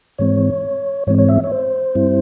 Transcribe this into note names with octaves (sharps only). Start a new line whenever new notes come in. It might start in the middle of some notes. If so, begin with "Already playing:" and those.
G#2 E3 G#3 C4 C#5
G#2 E3 G#3 C4 C#5
C#5
E5
C#5
C5
G2 G3 C4 E4